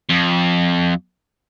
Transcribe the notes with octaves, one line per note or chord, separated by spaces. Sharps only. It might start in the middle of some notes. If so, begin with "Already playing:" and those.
F2